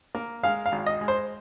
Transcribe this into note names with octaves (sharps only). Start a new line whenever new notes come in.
A#3
G#3 F5
F5
G#1
D#5
G#3
C5